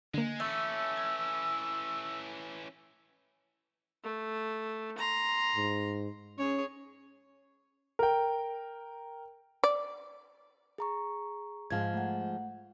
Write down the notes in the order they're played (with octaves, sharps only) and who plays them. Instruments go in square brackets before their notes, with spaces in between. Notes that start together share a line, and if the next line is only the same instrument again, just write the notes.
[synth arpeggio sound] D3 A#3 [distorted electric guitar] G#3
[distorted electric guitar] E3 C#4 [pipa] A3 [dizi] E6
[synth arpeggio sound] G#6
[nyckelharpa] A3
A#5 C6
[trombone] G#2
[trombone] C#4 [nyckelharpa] G#4 C#5
[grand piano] A#4 G5
[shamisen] D5
[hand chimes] G#4 A#5 C#6
[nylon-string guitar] G#2 F3 G#3 [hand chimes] F5 G#6
[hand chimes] A3 F#5